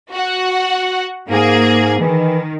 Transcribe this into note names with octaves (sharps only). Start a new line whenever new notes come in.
F#4 F#5
G#2 A#3 G#4
D#3 E3